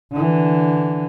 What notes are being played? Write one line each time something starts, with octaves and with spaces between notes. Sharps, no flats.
D3 E3